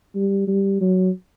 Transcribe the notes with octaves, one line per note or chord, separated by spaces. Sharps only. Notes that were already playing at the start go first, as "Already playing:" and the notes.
G3
G3
F#3